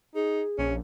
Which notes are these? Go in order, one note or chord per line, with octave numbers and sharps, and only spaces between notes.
D#4 G#4
A#1 C#4